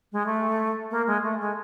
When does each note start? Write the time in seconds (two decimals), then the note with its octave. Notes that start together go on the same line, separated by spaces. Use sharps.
0.12 G#3
0.26 A3
0.91 A#3
1.07 G#3
1.24 A3
1.40 G#3